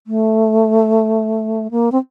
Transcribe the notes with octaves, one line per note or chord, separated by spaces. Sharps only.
A3
A#3
C4